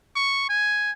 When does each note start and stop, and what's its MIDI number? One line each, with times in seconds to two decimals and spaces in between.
0.16 0.47 85
0.49 0.91 80